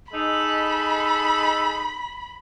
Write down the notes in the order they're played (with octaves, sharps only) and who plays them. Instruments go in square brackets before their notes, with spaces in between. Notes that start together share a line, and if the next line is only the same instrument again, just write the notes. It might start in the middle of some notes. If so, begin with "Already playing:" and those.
[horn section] G#3 D#4 A4 [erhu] B5